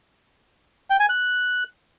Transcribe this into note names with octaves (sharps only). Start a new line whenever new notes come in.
G5
G#5
F#6